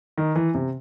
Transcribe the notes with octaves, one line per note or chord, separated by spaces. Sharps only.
D#3
E3
C3